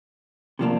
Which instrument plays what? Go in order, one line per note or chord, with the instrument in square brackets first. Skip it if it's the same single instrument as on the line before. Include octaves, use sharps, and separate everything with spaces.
[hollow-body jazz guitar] C3 F3 A#3 D4